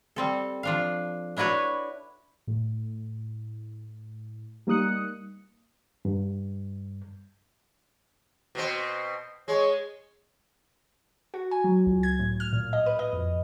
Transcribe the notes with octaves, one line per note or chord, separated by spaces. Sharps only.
G3 C4 A4
F3 D4 F5
D4 E4 F#4 B4 C#5
A2
G3 A#3 D#4 D#6 F#6 C#7
G2
B2 C4
G#3 C#5
F#4
G#5
F#3
C#2
G#6
A2
F6
A#2
D#5
B4
D#5
F2